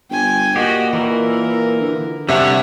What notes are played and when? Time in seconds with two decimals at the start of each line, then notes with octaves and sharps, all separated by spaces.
0.10 G1 G5 G#5
0.56 A#2 F#4 G4 D#5
0.93 E3 A#4
1.81 D3
2.29 C3 G3 C#4 C#5 E5 F#5